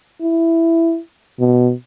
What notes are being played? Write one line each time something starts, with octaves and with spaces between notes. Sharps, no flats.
E4
B2